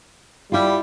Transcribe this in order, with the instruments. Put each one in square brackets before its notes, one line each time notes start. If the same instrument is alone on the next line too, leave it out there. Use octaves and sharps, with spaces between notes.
[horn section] G3 [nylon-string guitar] E4 F4